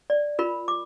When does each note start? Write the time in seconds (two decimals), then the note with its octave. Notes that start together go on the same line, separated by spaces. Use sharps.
0.10 D5
0.39 F4 A#4 B5
0.68 D6